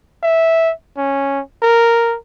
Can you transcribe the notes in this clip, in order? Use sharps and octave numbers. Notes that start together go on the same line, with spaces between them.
E5
C#4
A#4